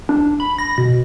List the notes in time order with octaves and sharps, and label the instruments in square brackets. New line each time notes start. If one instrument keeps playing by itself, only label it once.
[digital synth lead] D4
B5
A#6
B2